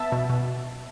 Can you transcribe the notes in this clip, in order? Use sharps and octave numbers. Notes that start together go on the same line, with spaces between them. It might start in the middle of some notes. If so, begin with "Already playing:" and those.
Already playing: B3 E5 A5
B2
B2